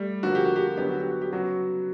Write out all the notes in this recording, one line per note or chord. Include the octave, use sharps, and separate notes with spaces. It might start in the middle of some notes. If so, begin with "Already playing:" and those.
Already playing: G3 A3
D3 F3 A#3 F#4
G4
F#4
G4
F#4
D3 F#3 B3 G4
F#4
G4
F#4
G4
C#3 F#3 B3 F#4